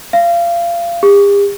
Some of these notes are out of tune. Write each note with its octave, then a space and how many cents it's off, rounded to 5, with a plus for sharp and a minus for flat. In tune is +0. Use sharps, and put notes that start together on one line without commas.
F5 -30
G4 +45